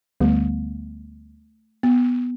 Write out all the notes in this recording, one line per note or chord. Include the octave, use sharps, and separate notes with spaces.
D2 D3 G3 A3 B3
B3